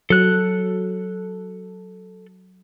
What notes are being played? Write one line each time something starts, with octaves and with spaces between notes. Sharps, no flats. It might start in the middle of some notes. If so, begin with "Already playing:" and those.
F#3 A4 F#6